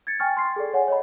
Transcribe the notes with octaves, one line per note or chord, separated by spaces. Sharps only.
G#6 A6 C#7
G5 G#5 C#6 F6 A6
C6 A6 C7
G#4 A4 D5
C#5 F#5 G#5
C#5 D#5 B5